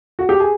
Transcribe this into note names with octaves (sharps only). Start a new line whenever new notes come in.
F#4
G4
G#4